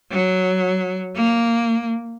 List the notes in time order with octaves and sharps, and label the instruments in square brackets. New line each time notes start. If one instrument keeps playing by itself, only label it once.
[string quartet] F#3
A#3